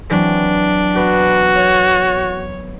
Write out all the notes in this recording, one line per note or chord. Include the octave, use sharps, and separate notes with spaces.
E3 F#3 C4 D4
B3 F#4 B4
C#5